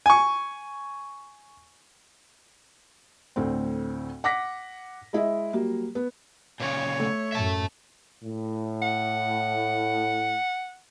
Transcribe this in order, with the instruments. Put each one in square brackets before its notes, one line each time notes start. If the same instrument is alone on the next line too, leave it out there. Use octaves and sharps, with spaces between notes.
[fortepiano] G#5 C#6
[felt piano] D2 A2 C4
F#5 D6 A#6 B6
G#3 E4 D#5
F#3 G3 A#3
B3
[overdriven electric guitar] A#2 C#3 [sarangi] C#5
[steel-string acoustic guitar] A3
[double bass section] F#2 A2 [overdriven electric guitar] E5 A5
[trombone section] A2
[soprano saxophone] F#5